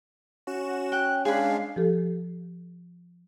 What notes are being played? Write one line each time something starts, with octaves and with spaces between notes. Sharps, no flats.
C#4 F#4 E7
G5 F#6
G#3 D4 G#4 F5 B5
F3 G4 A4